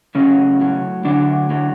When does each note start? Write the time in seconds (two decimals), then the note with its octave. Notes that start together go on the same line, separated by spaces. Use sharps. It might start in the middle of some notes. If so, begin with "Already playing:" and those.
0.15 A2 C#3 F#3 C#4
0.61 A2 F#3
1.05 A2 D3 F#3 D4
1.50 A2 F#3